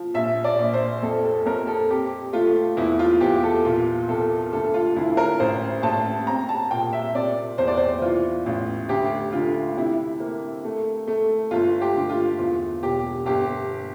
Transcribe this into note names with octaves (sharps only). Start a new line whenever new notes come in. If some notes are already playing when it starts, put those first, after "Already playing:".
Already playing: F3
A#1 E5
D5
A#1
C5
F2 A4
A4
F2 A#4
A4
C4 G4
A3 F4
E2 E4
F4
E2 G4
A4
A#2 F4
C2 A4
D2 A4
F4
D2 E4
A#4
A1 C5
A1 A5
C4 A#5
A5
A#2 G5
E5
C3 D5
E2 C5
D5
C5
E3 F4
A1
D2 G4
D3 F4
C3 E4
A#3
A3
A3
G1 F4
G4
D3
F4
E2 F4
E1 G4
G1 G4